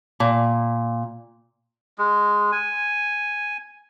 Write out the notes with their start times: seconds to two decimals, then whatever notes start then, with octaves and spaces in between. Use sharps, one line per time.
0.20 A#2
1.98 G#3
2.52 G#5